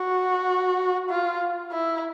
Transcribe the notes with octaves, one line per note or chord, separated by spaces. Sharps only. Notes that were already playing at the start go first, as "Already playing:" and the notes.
Already playing: F#4
F4
E4